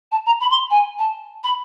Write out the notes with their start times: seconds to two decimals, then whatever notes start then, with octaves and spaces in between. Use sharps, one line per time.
0.11 A5
0.26 A#5
0.40 B5
0.50 C6
0.70 G#5
0.98 A5
1.43 B5